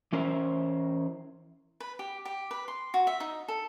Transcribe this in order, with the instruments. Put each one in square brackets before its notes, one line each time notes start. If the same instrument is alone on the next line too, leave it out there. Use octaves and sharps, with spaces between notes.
[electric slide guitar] E3 C#4 A#4 C5 E5
[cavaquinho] B4
G4
G4
B4
C6
F#4
E5
D#4
A4